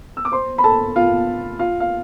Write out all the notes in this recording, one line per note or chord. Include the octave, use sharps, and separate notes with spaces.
E6
D6
C5 C6
B5
A4 A5
F4 F5
F4 F5
F5